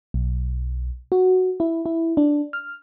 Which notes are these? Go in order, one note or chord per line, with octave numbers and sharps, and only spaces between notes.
B1
F#4
E4
E4
D4
F6